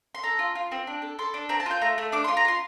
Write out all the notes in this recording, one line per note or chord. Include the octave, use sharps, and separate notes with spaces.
C6
A4 A#5
F4
F4
C4
D4
A4
A4 C6
D4
C4 A#5
A5
F4 G5
A3 A#5
A3
D4 D6
F4 C6
A#5
F4 C6